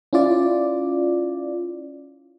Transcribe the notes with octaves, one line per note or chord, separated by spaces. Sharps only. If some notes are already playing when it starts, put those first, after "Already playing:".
C#4 E4 F4 D5